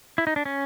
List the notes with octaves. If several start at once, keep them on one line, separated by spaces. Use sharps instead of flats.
E4
D#4
D4
C#4